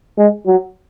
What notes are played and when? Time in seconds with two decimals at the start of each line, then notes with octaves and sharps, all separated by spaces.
0.18 G#3
0.47 F#3